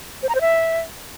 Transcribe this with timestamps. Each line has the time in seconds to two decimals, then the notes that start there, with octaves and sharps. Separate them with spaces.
0.23 C5
0.29 A#5
0.35 C5
0.41 E5